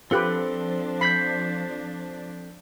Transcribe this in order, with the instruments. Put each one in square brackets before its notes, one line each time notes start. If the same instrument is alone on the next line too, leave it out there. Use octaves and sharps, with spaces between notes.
[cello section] F3 D4 [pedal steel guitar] C4 A4 F#6 [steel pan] F4 G4 B4
[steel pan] B5 [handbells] G6 B6 C7